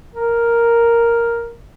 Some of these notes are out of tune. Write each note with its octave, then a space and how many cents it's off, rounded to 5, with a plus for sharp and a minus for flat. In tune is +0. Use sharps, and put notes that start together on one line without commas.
A#4 +0